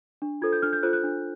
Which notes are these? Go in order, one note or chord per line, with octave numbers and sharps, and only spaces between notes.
D4
F4 A4 C5 G#6
G6
D4 F6
G6
F4 A4 C5 F#6
F#6
D4